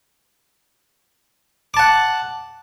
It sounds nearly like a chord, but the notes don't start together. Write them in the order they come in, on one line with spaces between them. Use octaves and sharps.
D6 A5 F#5